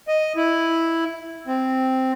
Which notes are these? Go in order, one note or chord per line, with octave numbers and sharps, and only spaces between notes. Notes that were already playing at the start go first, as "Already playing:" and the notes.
D#5
E4
C4